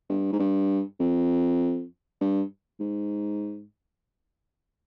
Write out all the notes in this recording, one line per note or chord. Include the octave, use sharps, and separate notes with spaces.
G2
G#2
G2
F2
G2
G#2